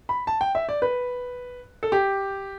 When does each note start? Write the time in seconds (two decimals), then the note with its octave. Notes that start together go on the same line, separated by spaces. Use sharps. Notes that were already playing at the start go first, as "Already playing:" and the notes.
0.09 B5
0.27 A5
0.41 G5
0.55 E5
0.69 D5
0.82 B4
1.83 A4
1.92 G4